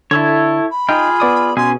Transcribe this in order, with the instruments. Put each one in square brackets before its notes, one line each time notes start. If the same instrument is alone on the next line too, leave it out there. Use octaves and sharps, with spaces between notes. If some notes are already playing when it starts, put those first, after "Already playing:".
[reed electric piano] D3 [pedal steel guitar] E4 A4 C#5
[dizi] B5
[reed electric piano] D#4 G5 [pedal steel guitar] F4 G#4
[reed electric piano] B3 D5 D#6
[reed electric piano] B2 [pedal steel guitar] C#4 G#4 [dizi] C6